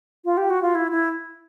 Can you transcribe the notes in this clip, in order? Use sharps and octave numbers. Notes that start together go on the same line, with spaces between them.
F4
G4
F#4
F4
E4
E4